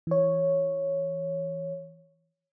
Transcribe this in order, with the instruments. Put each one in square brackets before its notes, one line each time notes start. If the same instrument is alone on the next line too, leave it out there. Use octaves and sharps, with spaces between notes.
[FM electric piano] E3 C#5